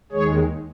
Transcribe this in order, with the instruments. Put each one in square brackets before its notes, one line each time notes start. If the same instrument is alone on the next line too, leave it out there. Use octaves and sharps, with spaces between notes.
[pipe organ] D#2 D#3 G#3 G#4 C#5